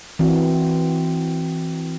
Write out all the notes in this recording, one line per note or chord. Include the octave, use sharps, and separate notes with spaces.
E3 C4 F#4